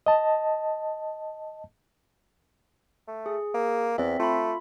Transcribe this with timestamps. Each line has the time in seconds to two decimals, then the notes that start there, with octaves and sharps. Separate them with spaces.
0.06 D#5 A5
3.08 A3
3.26 G#4
3.54 A#3
3.98 E2 C4 E5
4.20 A3 F4 B5